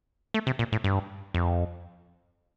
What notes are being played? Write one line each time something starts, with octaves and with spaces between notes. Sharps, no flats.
A3
C3
A#2
A2
G2
F2